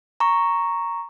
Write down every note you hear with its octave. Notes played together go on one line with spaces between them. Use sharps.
A#5 C#6